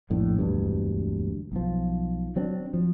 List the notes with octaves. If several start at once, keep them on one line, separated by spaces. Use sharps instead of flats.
A#1 F2 A2 D3
E1 D2 G2
B1 F3
F#3 C4 D4
F3